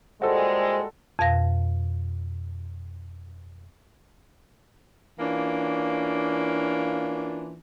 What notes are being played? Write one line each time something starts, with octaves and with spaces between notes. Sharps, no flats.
A#2 G3 G#3 F#4 A4 C5
F2 B2 F5 A#6
E3 A#3 C#4 D4 F4